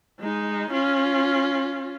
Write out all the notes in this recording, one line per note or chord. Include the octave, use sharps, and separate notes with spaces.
G#3 D#4
C#4 F4